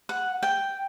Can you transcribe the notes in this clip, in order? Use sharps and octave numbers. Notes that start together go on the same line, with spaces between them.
F#5
G5